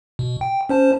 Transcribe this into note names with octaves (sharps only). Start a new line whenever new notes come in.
B2
G5
C#4 C5 A5